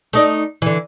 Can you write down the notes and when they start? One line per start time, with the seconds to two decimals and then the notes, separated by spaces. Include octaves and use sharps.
0.13 A3 D#4 D5
0.62 D3 E3